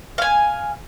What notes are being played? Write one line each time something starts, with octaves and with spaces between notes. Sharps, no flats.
F5 G#5